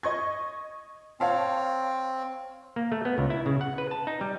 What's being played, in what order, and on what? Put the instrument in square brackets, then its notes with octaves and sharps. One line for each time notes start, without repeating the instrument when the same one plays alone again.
[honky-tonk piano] D#5 C#6 G#6
[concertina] C4 [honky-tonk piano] C#5 F5 A5
[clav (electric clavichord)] A#3
A3
B3
C#2
E4
C#3
F#5
B4
A5
D#4
G3